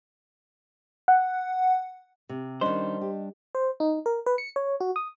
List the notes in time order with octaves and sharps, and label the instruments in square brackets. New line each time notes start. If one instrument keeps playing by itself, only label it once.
[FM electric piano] F#5
[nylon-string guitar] C3
[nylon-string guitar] D#3 C#4 [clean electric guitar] G3 D4 [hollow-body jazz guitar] C5 [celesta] D#5
[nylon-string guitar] G4
[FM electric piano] C5
D#4
A#4
B4
C#7
C#5
F#4
D#6